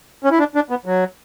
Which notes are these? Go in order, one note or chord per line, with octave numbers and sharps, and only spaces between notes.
C#4
E4
D4
D4
B3
F#3